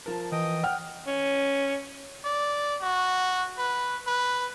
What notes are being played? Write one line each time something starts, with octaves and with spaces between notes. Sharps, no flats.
F3 A#4 A5
E3 D#5 G5 D#6
F#5 G5 F6
C#4
D5
F#4
B4
B4